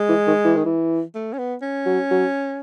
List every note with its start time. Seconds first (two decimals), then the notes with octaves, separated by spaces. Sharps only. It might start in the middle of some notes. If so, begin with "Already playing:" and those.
Already playing: G#3
0.09 E3
0.27 D#3
0.44 E3
0.55 D#3
0.65 E3
1.15 A3
1.34 C#4
1.39 B3
1.62 C#4
1.86 F#3
2.11 F#3